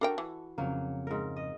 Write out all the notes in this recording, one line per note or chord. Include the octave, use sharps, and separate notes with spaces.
D4 F#4 A4 A#4 G5
E3
F2 C#3 F#3 A#3
G#2 A#4
D#5